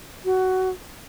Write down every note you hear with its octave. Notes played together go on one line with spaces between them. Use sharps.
F#4